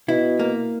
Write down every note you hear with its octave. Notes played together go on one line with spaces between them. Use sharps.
B2 E4
A#3